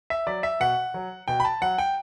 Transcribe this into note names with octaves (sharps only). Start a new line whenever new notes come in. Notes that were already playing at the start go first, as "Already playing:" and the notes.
E5
F#3 D5
E5
B2 F#5
F#3
B2 G5
B5
A5
F#3 F#5
G5